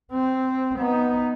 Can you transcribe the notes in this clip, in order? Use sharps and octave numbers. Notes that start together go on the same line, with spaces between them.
C4
B3 D#4